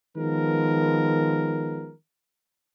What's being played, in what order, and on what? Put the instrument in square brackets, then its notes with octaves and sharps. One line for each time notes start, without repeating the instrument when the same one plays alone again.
[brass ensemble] D#3 F3 G#3 B3 A#4